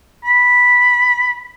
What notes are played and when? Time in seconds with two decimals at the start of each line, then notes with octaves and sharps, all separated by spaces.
0.25 B5